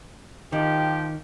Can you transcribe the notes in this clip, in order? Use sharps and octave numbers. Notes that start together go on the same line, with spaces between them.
D#3 F3 G4